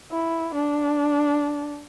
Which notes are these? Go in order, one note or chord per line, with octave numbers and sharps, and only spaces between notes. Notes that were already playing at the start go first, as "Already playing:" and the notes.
E4
D4